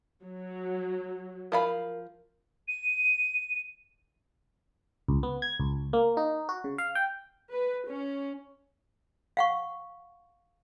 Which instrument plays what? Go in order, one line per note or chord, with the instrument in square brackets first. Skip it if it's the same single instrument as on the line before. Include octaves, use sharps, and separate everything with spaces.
[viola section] F#3
[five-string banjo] F3 F5 B5 [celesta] A#4
[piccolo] D#7
[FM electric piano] C#2
B3
G#6
C#2
A#3
D#4
F#4
C#3
F5
G5
[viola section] B4
C#4
[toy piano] F5 F#5 C#6